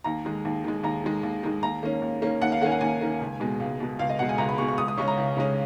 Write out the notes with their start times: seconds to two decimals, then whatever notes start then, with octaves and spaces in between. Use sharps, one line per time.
0.04 D#2 A#5
0.25 D#3 G#3
0.45 D#2
0.64 D#3 G#3
0.83 D#2 A#5
1.04 D#3 G#3
1.23 D#2
1.43 D#3 G#3
1.63 D#2 A#5
1.82 D#3 A#3 C#4
2.02 D#2
2.22 D#3 A#3 C#4
2.41 D#2 F#5
2.52 F5
2.61 D#3 A#3 C#4 F#5 G#5
2.72 F#5
2.81 D#2 G#5
3.01 D#3 A#3 C#4
3.21 C#2
3.40 B2 G#3
3.60 C#2
3.80 B2 G#3
3.99 C#2 F5
4.09 D#5
4.19 B2 F#5
4.23 G#3
4.29 G#5
4.38 C#2 A#5
4.49 B5
4.58 B2 G#3 C#6
4.68 C#6
4.78 C#2 D#6
4.88 D#6
4.98 C#3 G#3 C#4 C#6
5.08 A#5
5.17 C#2
5.37 C#3 G#3 C#4